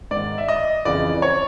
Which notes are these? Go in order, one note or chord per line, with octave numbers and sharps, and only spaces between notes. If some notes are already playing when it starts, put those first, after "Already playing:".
G#2 D#3 D5
E5
D#5
F2 C#3 E3 D5
C#5